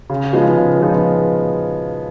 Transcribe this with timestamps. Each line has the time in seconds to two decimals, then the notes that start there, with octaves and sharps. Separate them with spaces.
0.10 C#3
0.33 F3 G#3 B3 D#4
0.57 C#3
0.80 F3 G#3 B3 D#4